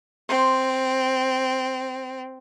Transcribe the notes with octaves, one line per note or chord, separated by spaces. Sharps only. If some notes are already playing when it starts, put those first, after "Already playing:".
C4 C5 C6